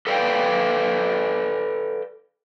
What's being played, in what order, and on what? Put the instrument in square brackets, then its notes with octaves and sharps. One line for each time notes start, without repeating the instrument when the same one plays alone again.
[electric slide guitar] A4 B4 D5 E5 F5 G5